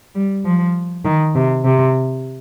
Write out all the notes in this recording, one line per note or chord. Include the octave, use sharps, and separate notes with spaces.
G3
F3
D#3
C3
C3